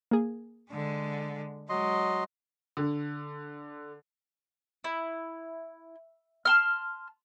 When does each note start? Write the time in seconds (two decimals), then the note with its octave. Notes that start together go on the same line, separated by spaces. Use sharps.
0.11 A#3 G#4
0.71 D3 G#3
1.69 F#3 G#3 D#5 C6
2.77 D3
4.84 E4
6.45 A5 C6 F6